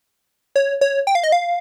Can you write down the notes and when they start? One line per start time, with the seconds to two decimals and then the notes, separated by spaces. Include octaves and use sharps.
0.56 C#5
0.81 C#5
1.07 G5
1.15 F5
1.23 D#5
1.32 F5